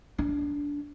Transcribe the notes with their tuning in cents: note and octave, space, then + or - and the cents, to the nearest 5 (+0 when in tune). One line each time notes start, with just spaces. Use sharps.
D4 -20